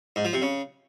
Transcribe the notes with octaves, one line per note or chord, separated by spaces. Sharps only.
G#2
F3
C3
C#3